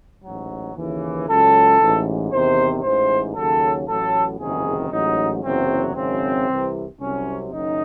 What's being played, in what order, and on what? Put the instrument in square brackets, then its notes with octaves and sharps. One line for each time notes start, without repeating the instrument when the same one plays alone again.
[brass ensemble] A1 G#2 F#3
D#2 C#3 E3
C#2 C#3 F#3 A4
A1 G#2 E3
E2 C3 D#3 C5
A1 G#2 E3 C5
D#2 C#3 F#3 A4
A1 A2 F#3 A4
F#1 E2 C3 D#3 G#4
A1 G#2 F#3 D#4
F#1 E2 C3 F#3 C4
G#1 F#2 C#3 C4
C2 C3 E3
C2 C3 F#3 C#4
F#1 F#2 D#3 D#4